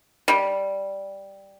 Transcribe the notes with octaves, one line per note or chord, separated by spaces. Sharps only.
G3